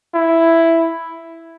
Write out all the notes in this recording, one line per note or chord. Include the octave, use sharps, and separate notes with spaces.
E4